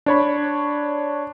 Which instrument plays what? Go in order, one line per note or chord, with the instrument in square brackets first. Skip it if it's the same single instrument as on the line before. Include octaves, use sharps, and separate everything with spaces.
[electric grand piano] D4 C#5 B5